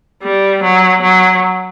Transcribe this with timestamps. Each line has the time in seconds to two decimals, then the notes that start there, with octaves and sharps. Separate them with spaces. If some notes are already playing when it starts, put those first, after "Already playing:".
0.23 G3
0.63 F#3
1.02 F#3